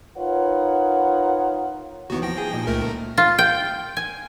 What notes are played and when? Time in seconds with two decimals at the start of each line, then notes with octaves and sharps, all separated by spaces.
0.18 D#4 F4 A#4 B4 C#5 F#5
2.10 D#2 D#3 E3 B3 F#4
2.22 F3 G5 A#6
2.38 G#4
2.53 A#2 D#4
2.67 C#2 A3 A#4
3.18 F4
3.39 G5
3.97 G#5